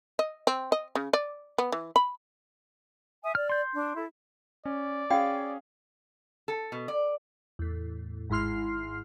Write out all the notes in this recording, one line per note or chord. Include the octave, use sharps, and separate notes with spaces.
D#5
C4
D#5
C#3
D5
B3
E3
B5
E5 G#5 D#6
D5 F6
C6 G6
D4
E4 A4
C#4 D5
C#4 F#4 G#4 F5 G5
A4
B2
D5
E2 A2
G#1 G#2 E4 C6 F6 C7